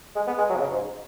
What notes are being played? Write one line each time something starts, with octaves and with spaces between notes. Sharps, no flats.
G#3
B3
G#3
F#3
B2
C#3
G#2